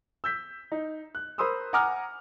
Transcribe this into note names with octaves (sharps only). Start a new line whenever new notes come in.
E6 G6 B6
D#4
F#6
A#4 C5 B5 C6 D#6 E6
F#5 G#5 A#5 D6 D#6 F6